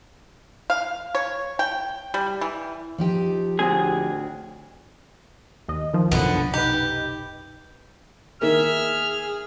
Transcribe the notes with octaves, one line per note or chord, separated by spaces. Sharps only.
F5
C#5
G5
G3
E3
F3 D#4 G4
D2 A2 C4 G#4
D#2 D#5
D#3 F3
C2 F#2 B2 D3 B3
D#4 G4 B4
D#3 A#3 G#4 E5 F6